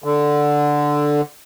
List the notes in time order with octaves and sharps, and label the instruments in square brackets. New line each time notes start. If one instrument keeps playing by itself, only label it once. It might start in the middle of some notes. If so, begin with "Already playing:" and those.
[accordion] D3